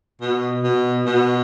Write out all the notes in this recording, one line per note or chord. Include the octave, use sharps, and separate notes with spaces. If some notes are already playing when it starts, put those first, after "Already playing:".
B2
B2
B2